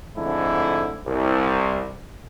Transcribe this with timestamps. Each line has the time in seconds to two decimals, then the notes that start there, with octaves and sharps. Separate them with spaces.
0.16 F2 G#2 D3 A3 E4
1.07 C2